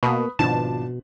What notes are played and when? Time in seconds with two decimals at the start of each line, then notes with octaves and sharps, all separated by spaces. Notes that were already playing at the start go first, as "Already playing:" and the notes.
0.03 B2 A#3 B4 B5 D#6
0.39 G#1 B2 F3 D4 A5